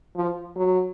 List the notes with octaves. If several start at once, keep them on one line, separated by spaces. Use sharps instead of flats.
F3
F#3